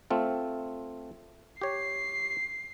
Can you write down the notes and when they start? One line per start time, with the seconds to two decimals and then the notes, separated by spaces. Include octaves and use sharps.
0.10 A3 C4 F4
1.61 G4 C#5 C7